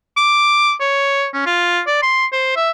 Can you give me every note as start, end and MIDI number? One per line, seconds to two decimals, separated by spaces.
0.17 0.73 86
0.80 1.27 73
1.34 1.43 61
1.46 1.81 65
1.87 2.01 74
2.02 2.26 84
2.32 2.53 72
2.56 2.71 76